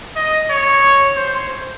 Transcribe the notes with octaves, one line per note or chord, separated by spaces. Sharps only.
D#5
C#5
C5